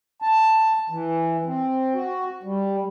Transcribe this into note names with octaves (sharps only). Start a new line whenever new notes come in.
A5
E3
C4
F#4
G3